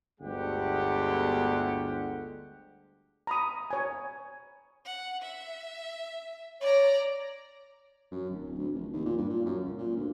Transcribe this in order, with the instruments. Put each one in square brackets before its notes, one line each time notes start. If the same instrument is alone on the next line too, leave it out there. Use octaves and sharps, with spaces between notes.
[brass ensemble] G1 D2 G#3 G4 F#5
[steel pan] A#5 B5 D#6
C#5 G#5
[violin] F#5
E5
[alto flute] C#5 [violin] D5 A#5
[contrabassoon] F#2
D1
D2
F1
D#2
A#2
G2
A#2
F#2
C#2
A#2
D2